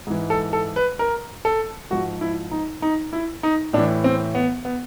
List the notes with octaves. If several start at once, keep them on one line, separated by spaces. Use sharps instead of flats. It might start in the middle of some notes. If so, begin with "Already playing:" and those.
G#2 E3
A4
A4
B4
A#4
A4
G#2 F3 F#4
E4
D#4
D#4
E4
D#4
A2 E3 D4
C4
B3
B3